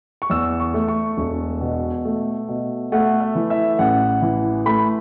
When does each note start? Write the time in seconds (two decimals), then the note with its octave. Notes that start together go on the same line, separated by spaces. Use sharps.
0.22 C#6
0.30 E2 E6
0.60 C#6
0.74 A3
0.88 C#6
1.17 E1
1.61 B2
2.05 A3
2.48 B2
2.92 A3 F#5
3.20 E5
3.35 E3
3.50 E5
3.79 A1 F#5
4.22 E3
4.66 A3 B5